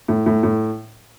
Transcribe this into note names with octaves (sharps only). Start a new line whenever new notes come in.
A2
A2
A2